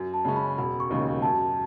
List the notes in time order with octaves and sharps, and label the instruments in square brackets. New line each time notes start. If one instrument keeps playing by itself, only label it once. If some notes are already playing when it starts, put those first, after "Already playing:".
Already playing: [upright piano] F#2
[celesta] A5
[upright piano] C#3 G#3 C#4
[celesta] B5
[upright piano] E1 [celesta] B5
[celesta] C#6
[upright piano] D#2 C#3 G#3 D#4
[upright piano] F#2 [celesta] A5